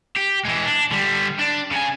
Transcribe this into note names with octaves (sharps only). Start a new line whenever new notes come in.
G4
E3 G#3
D4
D3 G3
D4
C#3 G#5